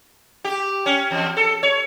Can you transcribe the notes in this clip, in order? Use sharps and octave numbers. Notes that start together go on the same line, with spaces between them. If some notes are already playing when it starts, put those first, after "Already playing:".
G4
C#4
E2
A4
C#5